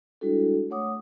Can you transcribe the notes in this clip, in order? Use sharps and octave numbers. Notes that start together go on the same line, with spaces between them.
G3 G#3 D4 E4 F#4 A4
A3 C#5 F#5 D6 D#6